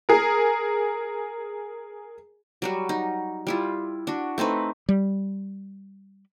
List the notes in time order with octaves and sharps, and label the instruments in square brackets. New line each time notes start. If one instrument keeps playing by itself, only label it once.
[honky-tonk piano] G#4 A#4
[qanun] F#3 G3 F#4
D#4
G3 E4 F4
D4 F#4
A3 C4 D#4 B4
[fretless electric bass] G3